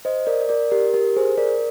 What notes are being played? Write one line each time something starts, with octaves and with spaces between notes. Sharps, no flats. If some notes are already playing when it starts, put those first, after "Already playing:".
C5 D#5
A#4 D5
A#4 D5
G4 A#4
G4 A#4
G#4 C5
A#4 D5